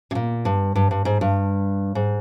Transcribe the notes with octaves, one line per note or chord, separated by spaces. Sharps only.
C3
A#2
G2
G2
G2
G#2
G2
G#2